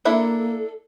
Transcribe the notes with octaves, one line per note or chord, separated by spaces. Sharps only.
A#3 D4 E4 A4 E5